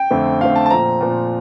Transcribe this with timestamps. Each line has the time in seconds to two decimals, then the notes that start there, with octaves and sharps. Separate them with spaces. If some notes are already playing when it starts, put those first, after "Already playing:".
Already playing: G5
0.11 F2 D3 A3 C4
0.40 F2 D3 A3 C4 F5
0.56 A5
0.66 A5
0.70 A#2 F3 C4 A#5
1.01 A#2 F3 C4